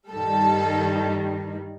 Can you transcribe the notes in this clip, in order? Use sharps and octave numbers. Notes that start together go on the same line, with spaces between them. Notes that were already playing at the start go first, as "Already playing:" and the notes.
G2 D#3 G3 A4